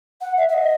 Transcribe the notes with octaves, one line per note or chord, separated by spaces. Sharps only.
F#5
E5
E5
D#5